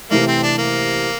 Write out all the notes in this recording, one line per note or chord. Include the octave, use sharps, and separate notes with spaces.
C3 E3 A3 A#3
C4
D4
A#3